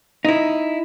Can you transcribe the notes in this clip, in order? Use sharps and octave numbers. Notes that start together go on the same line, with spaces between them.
D#4 E4